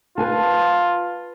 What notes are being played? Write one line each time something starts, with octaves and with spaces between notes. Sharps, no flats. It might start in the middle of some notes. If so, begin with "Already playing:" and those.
F4 B4 G#5 A5